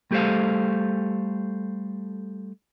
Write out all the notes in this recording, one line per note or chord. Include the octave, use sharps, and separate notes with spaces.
G3 A3 G4 A4 C5 F5